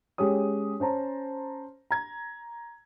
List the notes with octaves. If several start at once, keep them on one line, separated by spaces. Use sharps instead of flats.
G#3 C#4 G4 C#5 D#6
C#4 C5 A5 A#5
A#5 G#6